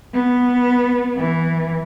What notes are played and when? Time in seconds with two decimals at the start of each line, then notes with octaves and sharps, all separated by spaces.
0.14 B3
1.17 E3